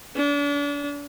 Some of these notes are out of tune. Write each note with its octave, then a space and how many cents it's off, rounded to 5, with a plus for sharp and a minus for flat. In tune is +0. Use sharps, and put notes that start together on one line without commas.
D4 -35